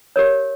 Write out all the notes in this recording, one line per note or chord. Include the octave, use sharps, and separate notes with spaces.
G4 A#4 C#5